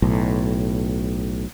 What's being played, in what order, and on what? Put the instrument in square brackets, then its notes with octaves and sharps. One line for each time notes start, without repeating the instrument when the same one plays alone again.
[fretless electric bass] B1 A2